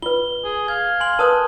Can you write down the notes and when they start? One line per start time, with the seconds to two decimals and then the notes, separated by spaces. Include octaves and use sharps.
0.02 F4 B4 G7
0.44 G#4
0.68 F5 G#6
1.00 G#5 C6 F#7
1.19 A#4 B4 A5 D#6 F#6